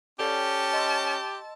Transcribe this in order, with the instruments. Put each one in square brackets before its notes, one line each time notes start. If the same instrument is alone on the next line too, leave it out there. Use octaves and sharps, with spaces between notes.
[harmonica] C#4 [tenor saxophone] G4 [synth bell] A4 D5 G5 [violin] A5
[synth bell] D#5 C6 E6